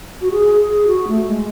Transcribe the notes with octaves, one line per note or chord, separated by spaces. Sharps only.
F#4
G#4
G#4
F#4
A3
G#3